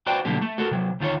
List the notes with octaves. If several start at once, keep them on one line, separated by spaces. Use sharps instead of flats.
F#4 B4 C5 D5 F5 G5
B2 D3 F#3 G3 A#3 G4
A3
F#4 A4 A#4
C3 F#3
D2 D#3 F4 C5 C#5